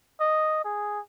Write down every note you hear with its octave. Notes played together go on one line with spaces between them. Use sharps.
D#5
G#4